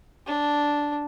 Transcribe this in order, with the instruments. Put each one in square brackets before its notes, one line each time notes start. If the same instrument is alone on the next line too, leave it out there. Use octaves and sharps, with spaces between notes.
[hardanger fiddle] D4